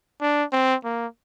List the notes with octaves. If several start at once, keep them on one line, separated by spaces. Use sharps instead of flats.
D4
C4
A#3